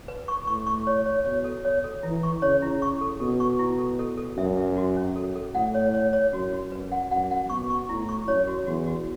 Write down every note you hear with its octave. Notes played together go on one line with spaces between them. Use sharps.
B4
C#6
A2 C#6
C#6
C#5
C#5
B2 C#5
A4
C#5
A4
E3 E4
C#6
C#3 C#5
E4
C#6
A4
B2 A4
C#6
E4
A4
A4
A4
F#2 E5
E5
F#4
C#4
A4
A4
A2 F#5
C#5
C#5
C#5
F#2 F#4
F#4
F#2 B4
F#5
F#2 F#5
F#5
B2 C#6
C#6
A2 E4
C#6
F#2 C#5
F#4
E2 F#4
F#4